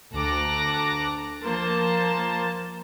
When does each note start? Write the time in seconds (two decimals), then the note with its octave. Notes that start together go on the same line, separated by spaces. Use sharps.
0.13 D2 A4 A#5 D6 F#6 A#6
1.43 F3 A#3 C5 A5 A6